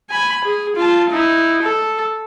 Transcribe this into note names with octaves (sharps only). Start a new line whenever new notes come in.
G#5 B5
G#4
F4 A5
D#4 E4
A4